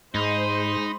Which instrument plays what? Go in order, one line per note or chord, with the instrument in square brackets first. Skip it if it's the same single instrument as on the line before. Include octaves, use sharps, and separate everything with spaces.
[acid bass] G#2 [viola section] G#3 C5 [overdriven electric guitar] D#4 [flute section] B5 C6